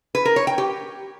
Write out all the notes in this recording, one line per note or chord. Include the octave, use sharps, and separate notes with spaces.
B4
A#4
C#5
G5
G4